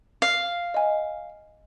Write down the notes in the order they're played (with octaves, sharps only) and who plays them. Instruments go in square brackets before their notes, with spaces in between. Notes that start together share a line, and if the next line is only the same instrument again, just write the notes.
[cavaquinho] F5
[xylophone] D#5 G#5